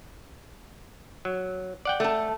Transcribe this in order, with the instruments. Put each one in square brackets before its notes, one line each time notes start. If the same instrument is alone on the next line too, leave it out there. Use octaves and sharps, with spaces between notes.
[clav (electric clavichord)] F#3
D5 F#5 G5
[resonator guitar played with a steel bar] A3 A4